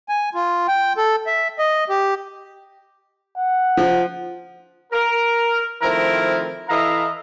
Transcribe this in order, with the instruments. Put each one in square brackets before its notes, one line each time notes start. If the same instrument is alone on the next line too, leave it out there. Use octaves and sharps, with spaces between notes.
[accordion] G#5
F4
G5
A4
E5
D#5
G4
[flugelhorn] F#5
[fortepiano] F3
[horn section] A#4
D#3 F3 A3 C4 E4 A#4
E3 E4 A4 D#5 F5 A#5